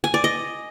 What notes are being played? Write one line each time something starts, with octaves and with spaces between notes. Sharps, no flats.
G#5
D5
D#5